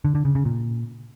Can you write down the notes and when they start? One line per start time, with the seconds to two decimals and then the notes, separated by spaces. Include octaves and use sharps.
0.05 D3
0.15 D3
0.25 C#3
0.35 C#3
0.45 A#2